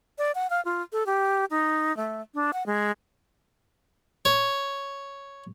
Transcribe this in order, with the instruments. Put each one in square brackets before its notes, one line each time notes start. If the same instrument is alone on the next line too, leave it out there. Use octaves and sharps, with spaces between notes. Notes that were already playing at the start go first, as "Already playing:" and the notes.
[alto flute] D5
F#5
F5
F4
A4
G4
D#4
A3
D4
F#5
G#3
[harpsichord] C#5